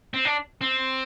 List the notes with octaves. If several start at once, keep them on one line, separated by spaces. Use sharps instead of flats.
C4
D4
C4